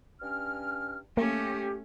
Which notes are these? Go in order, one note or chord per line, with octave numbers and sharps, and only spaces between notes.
G2 C#4 F6
A3 A#3 C#4 G4